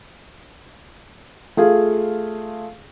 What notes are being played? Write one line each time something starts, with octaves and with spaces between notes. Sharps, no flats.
A3 F4 G#4 F5